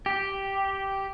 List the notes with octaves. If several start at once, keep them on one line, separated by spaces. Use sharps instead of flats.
G4